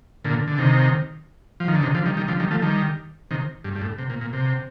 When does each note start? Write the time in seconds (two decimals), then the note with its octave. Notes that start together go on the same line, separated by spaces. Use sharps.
0.25 A#2 D3
0.47 D3
0.58 C3 D#3
1.60 F3
1.68 D#3
1.75 D3
1.83 C3 D#3
1.94 D3 F3
2.06 D#3 G3
2.17 D#3 G3
2.28 D3 F3
2.40 D#3 G3
2.51 F3 A3
2.62 D#3 G3
3.31 C3 D#3
3.64 G2
3.75 G2
3.82 A2
3.98 C3
4.10 A#2
4.21 A#2
4.33 C3